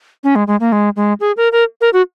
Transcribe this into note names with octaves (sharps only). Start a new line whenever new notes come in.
C#4
G#3
G#3
A#3
G#3
G#3
G#4
A#4
A#4
A#4
F#4